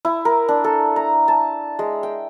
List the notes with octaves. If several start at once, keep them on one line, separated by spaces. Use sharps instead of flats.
E4
A#4
D4
A4
A#5
A5
G#3
G5